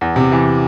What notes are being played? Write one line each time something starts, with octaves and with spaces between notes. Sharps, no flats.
E2
C3
E3